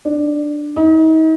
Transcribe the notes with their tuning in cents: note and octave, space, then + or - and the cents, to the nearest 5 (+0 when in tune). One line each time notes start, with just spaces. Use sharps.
D4 +10
D#4 +40